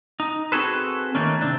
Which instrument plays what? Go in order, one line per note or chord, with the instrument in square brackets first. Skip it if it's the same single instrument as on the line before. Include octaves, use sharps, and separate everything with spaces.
[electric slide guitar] D#4
C4 F#4 G#4 A4 B4
D#3 A3 A#3 C#4
C3 C4 D4